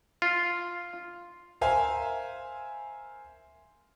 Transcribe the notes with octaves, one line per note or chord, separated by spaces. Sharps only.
F4
A#4 C5 E5 F5 G#5